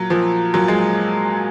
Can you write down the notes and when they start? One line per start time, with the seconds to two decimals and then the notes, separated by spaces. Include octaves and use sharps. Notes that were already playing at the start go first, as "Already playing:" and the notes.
Already playing: A#2 F#3
0.10 A#2 F3
0.54 A#2 F#3
0.68 G#3